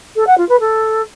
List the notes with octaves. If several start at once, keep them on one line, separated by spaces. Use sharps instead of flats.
A4
F#5
F4
B4
A4